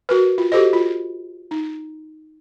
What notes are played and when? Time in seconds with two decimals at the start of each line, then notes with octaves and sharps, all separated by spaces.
0.09 F#4 A#4 B4
0.38 F4
0.52 F#4 G4 A4 C5 D#5
0.73 F4
1.51 D#4